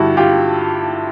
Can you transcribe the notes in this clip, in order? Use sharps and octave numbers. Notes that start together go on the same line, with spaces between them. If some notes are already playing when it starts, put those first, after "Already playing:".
Already playing: G2 D3 E4 F#4 G4
F4 G4